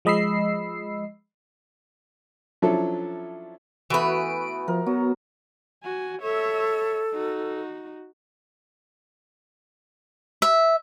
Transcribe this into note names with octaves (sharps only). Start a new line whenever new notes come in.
F3 G#3 D#5 B5 E6 C7
F3 F#3 C#4 D4 E4 A4
E3 A3 B3 F#4 B4 D7
F3 A#4
F#3 B3
F#4 G#5
A4 C#5 E5
D#4 F#4
E5